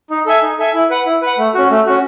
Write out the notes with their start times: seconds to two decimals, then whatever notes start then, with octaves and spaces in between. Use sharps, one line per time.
0.10 D#4
0.26 A4 E5 G#5
0.42 D#4
0.59 A4 E5 G#5
0.74 E4
0.90 B4 F#5
1.06 E4
1.22 B4 F#5
1.38 A3
1.54 C#4 F#4
1.70 A3
1.86 C#4 F#4